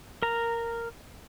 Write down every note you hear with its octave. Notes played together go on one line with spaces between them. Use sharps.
A#4 A#5